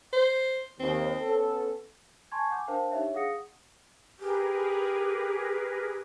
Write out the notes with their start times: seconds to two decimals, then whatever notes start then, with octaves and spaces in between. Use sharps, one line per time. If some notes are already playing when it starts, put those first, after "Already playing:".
0.13 C5
0.80 D#2 C4
1.20 B3 C#4 A4
2.32 G#5 A5 C6 C#6 G#6
2.50 F#5 G#5 D6 G6
2.67 D4 A#4 C5 F5 G5 A5
2.92 D4 D#4 G4 C#5 E5
3.14 G#4 F5 F#5 D#6 A#6 C#7
4.20 G4 G#4 A#4 B4